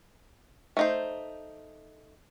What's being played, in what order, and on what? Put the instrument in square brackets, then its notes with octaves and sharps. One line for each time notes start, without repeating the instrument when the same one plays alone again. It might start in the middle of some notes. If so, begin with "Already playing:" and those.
[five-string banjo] A3 D#4 C5